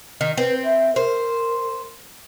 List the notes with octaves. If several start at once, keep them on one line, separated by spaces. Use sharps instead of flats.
D#3 D#5
C4 B4
E5
A#4 C5